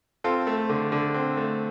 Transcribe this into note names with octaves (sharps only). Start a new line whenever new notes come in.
C4 F4 A4
A3
D3
D3
C4
A3